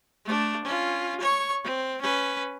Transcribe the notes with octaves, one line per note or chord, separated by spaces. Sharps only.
A3 D4
C#4 F4
C#5 C#6
C4
C#4 B4